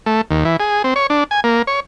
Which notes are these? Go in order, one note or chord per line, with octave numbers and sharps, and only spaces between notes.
A3
D#2
E3
G#4
C4
C#5
D4
G#5
A#3
C#5